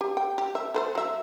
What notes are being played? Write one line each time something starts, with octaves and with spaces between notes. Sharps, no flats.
G4
G5
G4
E5
A4 B4 C5
F#3 E5